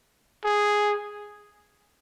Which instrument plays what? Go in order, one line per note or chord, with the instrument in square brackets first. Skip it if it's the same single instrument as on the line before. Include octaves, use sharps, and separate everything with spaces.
[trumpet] G#4